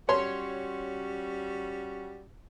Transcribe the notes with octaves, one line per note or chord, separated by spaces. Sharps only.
G3 C#4 F#4 C#5 C6